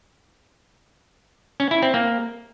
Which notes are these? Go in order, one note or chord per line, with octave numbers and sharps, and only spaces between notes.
C#4
E4
C4
A#3